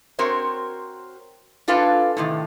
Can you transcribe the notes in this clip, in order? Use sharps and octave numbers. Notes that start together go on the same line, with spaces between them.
C4 F#4 A#4 C5 C#5
D4 F4 A4 B4 F5 G#5
A2 C3 D#3